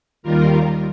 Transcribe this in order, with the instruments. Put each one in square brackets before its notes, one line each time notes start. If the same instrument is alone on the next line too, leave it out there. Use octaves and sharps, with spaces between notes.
[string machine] D#2 D#3 G3 F4 A#4